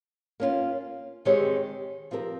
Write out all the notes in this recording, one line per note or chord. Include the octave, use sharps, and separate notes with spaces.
A#3 C#4 F4
D#3 G#3 C4 G4 C#5
F3 C4 G4 A#4